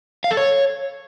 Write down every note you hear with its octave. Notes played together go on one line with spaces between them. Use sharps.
F5
A4
C#5